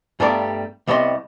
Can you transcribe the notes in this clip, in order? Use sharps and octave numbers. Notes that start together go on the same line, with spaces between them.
G2 G3 A3 B3 A#4 D5
C2 G3 B3 C#5 D#5 C6